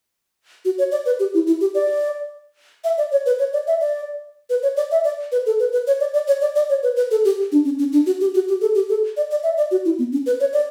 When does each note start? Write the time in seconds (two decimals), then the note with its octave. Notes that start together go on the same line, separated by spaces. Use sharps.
0.65 F#4
0.78 C#5
0.92 D5
1.06 B4
1.20 G4
1.34 E4
1.47 E4
1.61 G4
1.75 D5
2.84 E5
2.98 D5
3.12 C#5
3.26 B4
3.39 C#5
3.53 D5
3.67 E5
3.81 D5
4.50 B4
4.63 C#5
4.77 D5
4.91 E5
5.04 D5
5.32 B4
5.46 A4
5.60 B4
5.73 B4
5.87 C#5
6.00 D5
6.14 D5
6.27 C#5
6.41 D5
6.56 D5
6.70 C#5
6.83 B4
6.96 B4
7.11 A4
7.25 G4
7.52 D4
7.65 C#4
7.79 C#4
7.93 D4
8.06 F#4
8.21 G4
8.35 F#4
8.48 G4
8.61 A4
8.75 G4
8.89 A4
9.17 D5
9.31 D5
9.43 E5
9.57 D5
9.71 F#4
9.85 E4
9.99 B3
10.12 C#4
10.26 B4
10.40 C#5
10.53 D5